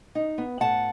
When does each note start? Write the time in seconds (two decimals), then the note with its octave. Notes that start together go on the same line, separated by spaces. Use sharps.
0.15 D#4
0.38 B3
0.60 A2 F#5 A5